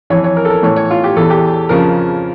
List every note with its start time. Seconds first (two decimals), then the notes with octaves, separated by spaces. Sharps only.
0.10 F2 E3 C#5
0.24 C#5
0.36 A#4
0.45 A4
0.50 A#4
0.63 A2 E3 C#5
0.76 C#5
0.91 F4
1.04 G4
1.16 E2 E3 A4
1.30 G4
1.69 F2 C#3 F3 A#4